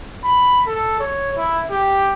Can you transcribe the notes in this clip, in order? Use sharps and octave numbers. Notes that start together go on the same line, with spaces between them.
B5
A4
C#5
E4
G4